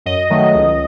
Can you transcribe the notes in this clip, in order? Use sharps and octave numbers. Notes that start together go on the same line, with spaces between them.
F#2 D#5
D#3 F#3 A3
C#2